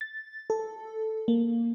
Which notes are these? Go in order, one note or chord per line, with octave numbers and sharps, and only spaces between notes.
A6
A4
A#3